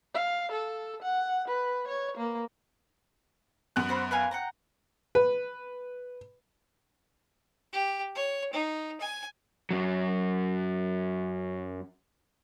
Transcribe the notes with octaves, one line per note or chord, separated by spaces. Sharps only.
F5
A4
F#5
B4
C#5
A#3
F#2 B3 F#6
F#4 C5 B5
B4 F5 G#5
F#5 G5 A#5
B4
G4
C#5
D#4
G#5
F#2 F#3